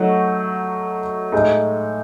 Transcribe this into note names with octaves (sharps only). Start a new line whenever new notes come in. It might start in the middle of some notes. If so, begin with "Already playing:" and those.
Already playing: F#3 A3 D#4 F#4
A2 G#3 D#4